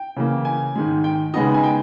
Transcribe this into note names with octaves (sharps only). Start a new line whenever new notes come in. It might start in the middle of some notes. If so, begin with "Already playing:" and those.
Already playing: G5
C#3 E3 A#3
G#5
G#2 D#3 G#3
G5
C#3 G#3 B3 D#4 D#5
G#5
G5